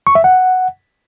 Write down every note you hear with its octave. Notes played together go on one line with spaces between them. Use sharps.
C#6
E5
F#5